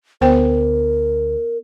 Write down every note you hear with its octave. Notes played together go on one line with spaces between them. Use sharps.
D2 D3 B3 A#4 C5 G5